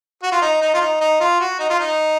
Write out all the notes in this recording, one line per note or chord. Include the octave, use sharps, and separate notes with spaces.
F#4
F4
D#4
D#4
F4
D#4
D#4
F4
F#4
D#4
F4
D#4